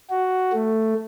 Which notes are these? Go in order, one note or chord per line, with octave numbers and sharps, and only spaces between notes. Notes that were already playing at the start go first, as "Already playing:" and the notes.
F#4
A3